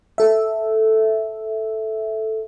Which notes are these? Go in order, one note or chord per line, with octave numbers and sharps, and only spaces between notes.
A4 E5